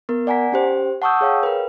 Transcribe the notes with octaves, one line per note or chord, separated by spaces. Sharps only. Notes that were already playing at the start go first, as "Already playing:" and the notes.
B3 A#4
D5 F#5 G#5 A#5 B6
C#4 G4 C5
F#5 A5 C#6 D#6 E6 G6
G#4 C#5 F5 G5
A#4 B4